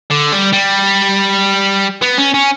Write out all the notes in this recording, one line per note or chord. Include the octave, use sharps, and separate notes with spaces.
D3
G3
G3
B3
C#4
C#4